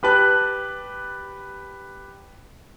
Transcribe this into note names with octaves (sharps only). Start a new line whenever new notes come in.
G4 B4 A5 F#6